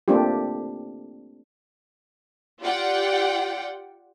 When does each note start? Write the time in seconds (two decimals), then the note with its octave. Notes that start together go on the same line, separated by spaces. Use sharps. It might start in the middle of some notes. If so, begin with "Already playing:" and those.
0.08 A3 A#3 C4 D4 F4 G4
2.62 F4 G4 D5 F#5 G5